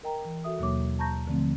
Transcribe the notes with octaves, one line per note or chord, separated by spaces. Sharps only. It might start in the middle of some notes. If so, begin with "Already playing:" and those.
A#4 D#5 G5 A#5
E3
F#4 A4 E5 D#6
D#2 B2 F#3 A#3 C#5 D6
A5 A#5 C#6 G6 A#6
D3 F3 A3 C4